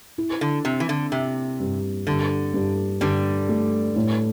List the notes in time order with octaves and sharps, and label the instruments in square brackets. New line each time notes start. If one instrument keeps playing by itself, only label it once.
[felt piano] E4
[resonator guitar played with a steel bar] D3
[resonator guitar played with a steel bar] C3 [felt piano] C4
[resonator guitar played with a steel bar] E3
D3
[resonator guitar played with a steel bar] C3 [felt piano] C4
[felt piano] G2
[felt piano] G2 [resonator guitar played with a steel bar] D3
[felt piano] G2
[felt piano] G2 [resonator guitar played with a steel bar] D3 G3
[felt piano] A3
A2